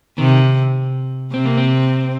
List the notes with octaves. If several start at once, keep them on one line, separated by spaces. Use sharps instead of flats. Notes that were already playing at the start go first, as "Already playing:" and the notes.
C3 D#3
C3 C4
A#3
C4